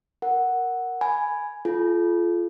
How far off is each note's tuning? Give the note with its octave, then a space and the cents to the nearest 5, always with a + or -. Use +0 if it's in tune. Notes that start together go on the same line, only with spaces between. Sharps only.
A#4 +0 F#5 +0
G#5 +0 B5 +0
F4 -15 A4 -40